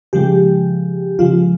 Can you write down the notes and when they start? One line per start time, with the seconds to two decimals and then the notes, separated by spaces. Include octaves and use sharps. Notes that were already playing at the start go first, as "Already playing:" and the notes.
0.13 C#3 F3 G#3 G4
1.19 C#3 F3 G#3 F4